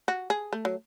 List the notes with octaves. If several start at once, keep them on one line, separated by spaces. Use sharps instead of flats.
F#4
G#4
A3
F#3